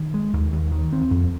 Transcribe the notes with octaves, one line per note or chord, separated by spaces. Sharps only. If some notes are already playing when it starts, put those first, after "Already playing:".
Already playing: D#3
G#3
D#2
D#2
D#3
C4
F2